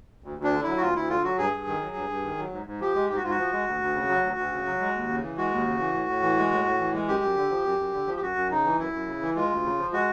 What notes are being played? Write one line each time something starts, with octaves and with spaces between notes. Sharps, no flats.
D2
D2
D4
D3
F#3 E4
F#4
D2 F4
D2 E4
D3 F4
F#3 F#4
G2 G#4
G2
D#3
F#3
G2
G2
D#3
F#3
G#2
G#2
F3 G4
G#3
G#2 G4
F#4
G#2 F4
F#4
F3
G#3
D2
D2
C#3
F#3
D2
D2
C#3
F#3
G#3
D#2
C#3
E3
G#3 F#4
D#2
C#3
E3
A2
A2
E3
G#3
A2
A2
E3
G#3
F#2 G4
F#2
D3
F3
F#2
F#2
D3
F3
G4
F#2 F#4
F#2
C#3 D#4
E3
F#2 E4
F#2
C#3
E3
G#3 F4
D2
C#3
F3
G#3 F#4